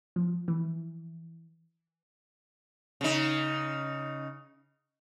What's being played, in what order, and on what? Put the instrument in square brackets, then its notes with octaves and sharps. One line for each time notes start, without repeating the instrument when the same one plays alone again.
[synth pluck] F3
E3
[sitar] C#3 D#4